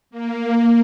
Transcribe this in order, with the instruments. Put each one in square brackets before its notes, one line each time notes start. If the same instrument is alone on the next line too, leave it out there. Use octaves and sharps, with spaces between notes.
[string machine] A#3